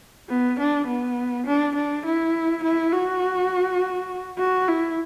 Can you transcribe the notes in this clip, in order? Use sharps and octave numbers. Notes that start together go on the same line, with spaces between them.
B3
D4
B3
D4
D4
E4
E4
F#4
F#4
E4